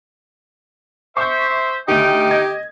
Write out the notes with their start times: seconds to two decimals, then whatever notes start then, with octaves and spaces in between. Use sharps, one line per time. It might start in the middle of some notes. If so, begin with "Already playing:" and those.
1.17 C5 E5 C#6 G6
1.88 D2 D#3 D#4 G4 G5
2.31 D#5 G#6